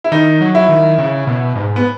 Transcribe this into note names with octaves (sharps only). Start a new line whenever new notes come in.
E4
D#3 D#4
F#3
E4
D#3
C#3
B2
G#2
B3